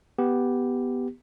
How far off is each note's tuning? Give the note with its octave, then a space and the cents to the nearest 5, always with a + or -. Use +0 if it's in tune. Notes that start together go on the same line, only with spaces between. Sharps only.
B3 +0 G4 +0